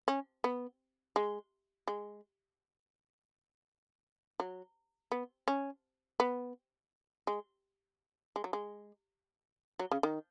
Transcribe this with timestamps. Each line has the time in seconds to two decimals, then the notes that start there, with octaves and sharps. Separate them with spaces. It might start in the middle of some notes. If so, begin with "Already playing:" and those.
0.08 C#4
0.44 B3
1.16 G#3
1.88 G#3
4.40 F#3
5.12 B3
5.48 C#4
6.20 B3
7.27 G#3
8.36 G#3
8.44 F#3
8.53 G#3
9.79 F#3
9.91 C#3
10.03 D#3